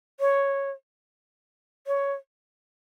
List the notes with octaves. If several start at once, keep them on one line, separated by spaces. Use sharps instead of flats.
C#5
C#5